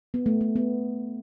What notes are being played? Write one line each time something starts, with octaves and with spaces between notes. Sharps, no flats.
B3
A3
A3
B3